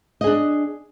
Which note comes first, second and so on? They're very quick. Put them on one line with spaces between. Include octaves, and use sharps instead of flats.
D#5 G#4 D4